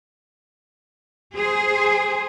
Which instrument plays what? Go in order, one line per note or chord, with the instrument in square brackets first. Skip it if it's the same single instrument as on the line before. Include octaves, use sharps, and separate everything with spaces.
[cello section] G#4 C5